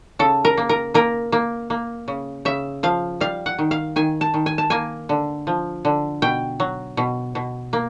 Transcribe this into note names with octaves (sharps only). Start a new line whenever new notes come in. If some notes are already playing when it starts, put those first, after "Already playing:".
C#3 A4
A#4
A#3
A#4
A#3 A#4
A#3
A#3
C#3
C#3 E5
F3 F5
G3 F5
F#5
D#3
F5
D#3 G#5
A5
D#3
G#5
A5
A#3 G#5
D3
F3
D3
B2 G5
F#3
B2
B2
A#3